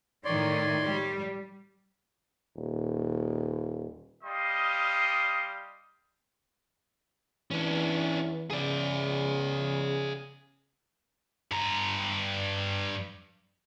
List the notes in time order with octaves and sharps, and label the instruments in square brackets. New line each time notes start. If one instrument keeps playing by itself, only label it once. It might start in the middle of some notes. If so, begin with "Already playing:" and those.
[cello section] A2 D#3 [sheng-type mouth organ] C#5 D5 C6
[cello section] G3
[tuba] D#1
[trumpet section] G3 D#5 F5 C6 D#6
[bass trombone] E3 [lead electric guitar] C#4 D4
[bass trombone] C#3 [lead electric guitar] G#4 D5
[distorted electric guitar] G2 A#5